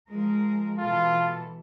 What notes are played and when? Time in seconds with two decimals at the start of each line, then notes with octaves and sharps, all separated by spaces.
0.10 F3 G#3 A#4
0.78 B2 E3 F4 A4